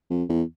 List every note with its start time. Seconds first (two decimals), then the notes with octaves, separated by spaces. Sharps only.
0.10 F2
0.29 E2